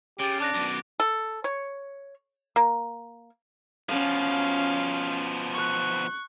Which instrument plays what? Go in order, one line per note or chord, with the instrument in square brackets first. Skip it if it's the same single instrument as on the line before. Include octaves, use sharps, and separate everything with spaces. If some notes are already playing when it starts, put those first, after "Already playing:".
[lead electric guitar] C#3 [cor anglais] G4 [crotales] A6 D7
[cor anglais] D4 [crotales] D6 F#6 A#6
[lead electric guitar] F#2 B2
[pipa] A4
C#5
A#3
[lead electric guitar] B2 F3 [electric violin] C#4 F5
[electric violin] C#6 F#6